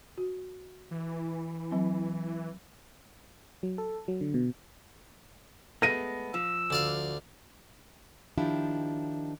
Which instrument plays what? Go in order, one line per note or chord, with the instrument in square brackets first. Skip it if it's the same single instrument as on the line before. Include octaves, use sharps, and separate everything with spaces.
[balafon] F#4
[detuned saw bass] E3
[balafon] F#3 C4
[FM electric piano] F#3
A4
F#3
D3
B2
[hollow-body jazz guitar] G#3 A3 B3 [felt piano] A#6 D#7
[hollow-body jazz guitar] F3 [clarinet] E6
[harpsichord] D2 D5 F5
[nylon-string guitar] D#3 F3 D4 E4 F4 G4